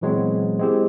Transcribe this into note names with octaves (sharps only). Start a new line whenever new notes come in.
A#2 E3 F#3 G#3 B3 C4
G#3 A#3 C4 E4 G4 G#4